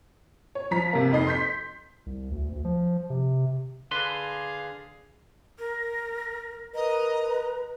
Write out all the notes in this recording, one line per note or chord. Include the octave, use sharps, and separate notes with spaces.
C#5
F3 A#5 B6
C3 A#3
F2 D#4 D#5 C7
C6 G6 B6
C2
D2
D2
F3
C3
D3 G#4 B4 F5 C6
A#4
A#4 B4 D#5 A#5